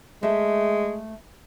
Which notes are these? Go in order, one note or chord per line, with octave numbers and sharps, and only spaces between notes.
G#3 A3 E5